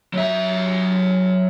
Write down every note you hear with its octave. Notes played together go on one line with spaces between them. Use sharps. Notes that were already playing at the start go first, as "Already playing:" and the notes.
F#3 E5